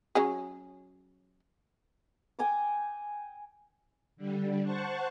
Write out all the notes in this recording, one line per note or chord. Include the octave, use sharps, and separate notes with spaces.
F#3 C#4 G#4
G5 G#5 D6 D#6
D3 G3
C5 F#5 A5 C#6